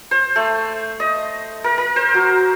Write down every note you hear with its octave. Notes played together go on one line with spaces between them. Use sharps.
C5
A3
D#5
A#4
A#4
C5
F#3